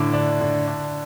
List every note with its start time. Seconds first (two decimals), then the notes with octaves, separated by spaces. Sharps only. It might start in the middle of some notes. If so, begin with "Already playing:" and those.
Already playing: A2 D3 D6
0.13 D4
0.41 D3
0.67 D4